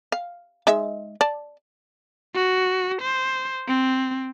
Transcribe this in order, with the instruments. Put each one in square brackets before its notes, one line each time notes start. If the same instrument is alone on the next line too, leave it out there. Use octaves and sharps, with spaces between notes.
[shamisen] F5
G#3 D#4 E5
D5 A5
[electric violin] F#4
C5
C4